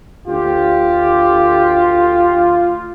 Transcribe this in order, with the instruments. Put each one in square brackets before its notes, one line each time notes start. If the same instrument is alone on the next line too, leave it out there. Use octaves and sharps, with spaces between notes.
[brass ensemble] D2 G4 [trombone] F4